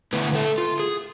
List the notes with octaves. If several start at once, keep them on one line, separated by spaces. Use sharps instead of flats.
D3 A3 B3 E4 B4
A3 A4
F4
G#4